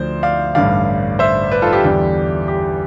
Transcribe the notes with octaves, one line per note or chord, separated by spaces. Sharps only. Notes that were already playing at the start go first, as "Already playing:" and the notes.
Already playing: D2 D3 F3 C5 D5
D5 F5
A1 G2 D3 G3 D5 F5
C5 E5
B4 D5
F4 A4
G4
E2 D3 G3
G4